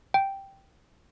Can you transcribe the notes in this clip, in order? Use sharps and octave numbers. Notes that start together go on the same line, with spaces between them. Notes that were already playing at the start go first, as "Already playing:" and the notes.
G5